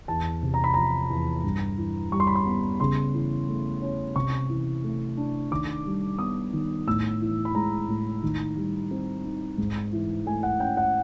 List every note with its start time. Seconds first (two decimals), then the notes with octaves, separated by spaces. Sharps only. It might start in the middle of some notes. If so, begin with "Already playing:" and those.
0.08 E2 A5
0.43 C3
0.54 A#5
0.64 B5
0.74 F3 A#5
1.10 E2
1.44 G2
1.78 E3
2.12 G3 C#6
2.20 C6
2.27 B5
2.35 C6
2.46 B3
2.80 C#3 C6
3.14 E3
3.48 A3
3.82 C#4
4.16 C3 C#6
4.49 E3
4.84 A3
5.17 D4
5.51 D#3 D6
5.86 G3
6.19 B3 D#6
6.53 D#3
6.87 A2 E6
7.21 E3
7.45 B5
7.55 G#3 A#5
7.88 A2
8.23 D#3
8.56 G3
8.91 C4
9.24 D#4
9.58 G#2
9.93 E3
10.26 A3 G#5
10.43 F#5
10.60 C#4 G5
10.77 F#5